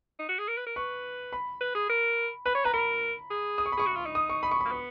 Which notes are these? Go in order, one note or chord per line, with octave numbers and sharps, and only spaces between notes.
D#4
F#4
G#4
A#4
B4
A#4
B4 C#6
B5
B4
G#4
A#4
B4 B5
C#5
B4 A#5
A#4 B5
G#4
D#6
C#6
B5
G#4 C#6
F#4
F4
D#4
D#6
C#6
B5
C#6
A#3 B5
B3